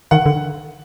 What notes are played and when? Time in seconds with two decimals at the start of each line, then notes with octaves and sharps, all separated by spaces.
0.11 D#3 F#5
0.26 D3